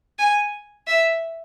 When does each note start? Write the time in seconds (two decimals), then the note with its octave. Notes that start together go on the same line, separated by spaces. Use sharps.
0.19 G#5
0.87 E5